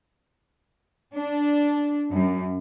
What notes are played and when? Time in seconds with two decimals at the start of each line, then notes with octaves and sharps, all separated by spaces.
1.16 D4
2.12 F#2